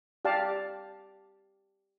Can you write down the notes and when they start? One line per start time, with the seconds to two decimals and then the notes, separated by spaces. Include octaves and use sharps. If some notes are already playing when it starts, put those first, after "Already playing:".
0.25 G4 D5 F5 A5